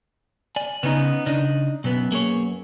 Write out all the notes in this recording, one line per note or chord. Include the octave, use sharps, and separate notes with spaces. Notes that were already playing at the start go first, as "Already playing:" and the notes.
D5 G#5
C#3 B3 C#4 D#4
C#3 D4 D#4
F#2 B2 B3
A#3 G#4 C#5